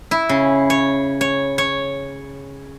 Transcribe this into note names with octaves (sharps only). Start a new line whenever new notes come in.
E4
C#3
C#5
C#5
C#5